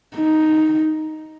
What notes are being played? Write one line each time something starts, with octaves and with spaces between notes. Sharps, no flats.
D#4